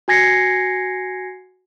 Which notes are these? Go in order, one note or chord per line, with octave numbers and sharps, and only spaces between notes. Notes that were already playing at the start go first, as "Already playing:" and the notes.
F#4 G#5 G#6 A#6 C7 C#7